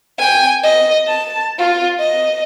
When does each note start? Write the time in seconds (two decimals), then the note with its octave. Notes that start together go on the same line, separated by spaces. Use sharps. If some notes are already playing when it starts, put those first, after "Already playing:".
0.18 G5 G#5
0.64 D#5
1.07 A5
1.59 F4
2.00 D#5